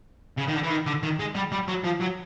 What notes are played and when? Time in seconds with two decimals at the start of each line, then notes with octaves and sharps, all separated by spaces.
0.38 C#3
0.48 D#3
0.54 D3
0.63 E3
0.70 D#3
0.87 D3
1.03 D#3
1.19 G#3
1.35 G3
1.52 G3
1.68 F#3
1.84 F3
2.01 F#3